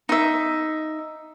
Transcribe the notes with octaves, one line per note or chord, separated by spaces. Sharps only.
D#4 E5